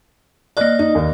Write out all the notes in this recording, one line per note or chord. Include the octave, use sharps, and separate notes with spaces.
A#3 D5 D#5 F#6
D#4
D#2